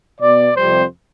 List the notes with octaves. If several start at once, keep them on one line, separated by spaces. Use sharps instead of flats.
B2 B3 D5
F2 C3 G3 C5